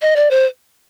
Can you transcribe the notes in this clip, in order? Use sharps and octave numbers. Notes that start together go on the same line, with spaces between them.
D#5
D5
C5